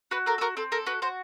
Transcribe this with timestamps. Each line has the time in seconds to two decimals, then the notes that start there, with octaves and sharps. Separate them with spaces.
0.11 F#4 B4
0.26 A4 A#4
0.38 A4
0.41 F#4 A#4
0.57 C4 A4
0.72 A4 A#4
0.86 F#4 B4
1.02 F#4 C5